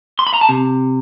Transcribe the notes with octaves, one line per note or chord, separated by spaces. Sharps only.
C6
B5
A#5
A5
C3